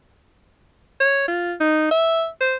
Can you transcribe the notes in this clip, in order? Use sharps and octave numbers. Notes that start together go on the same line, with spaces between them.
C#5
F4
D#4
E5
C5